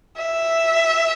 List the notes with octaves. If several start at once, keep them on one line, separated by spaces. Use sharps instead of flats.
E5